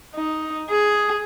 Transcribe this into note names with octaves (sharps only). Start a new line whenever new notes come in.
D#4
G#4